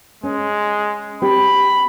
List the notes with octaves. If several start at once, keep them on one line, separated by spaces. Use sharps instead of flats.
G#3 C#4
C4 G4 B5